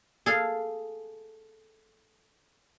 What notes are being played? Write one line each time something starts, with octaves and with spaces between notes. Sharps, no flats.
G#4 A4 F5